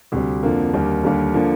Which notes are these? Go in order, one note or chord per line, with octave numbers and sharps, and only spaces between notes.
D2 C3 G3
F2 D3 F3 A#3
D#2 D3 G3 A#3
D#2 D3 G3 A#3
D3 F3 A#3